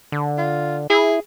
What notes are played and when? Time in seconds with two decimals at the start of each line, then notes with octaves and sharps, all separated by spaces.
0.12 D3
0.38 F4
0.90 E4 G#4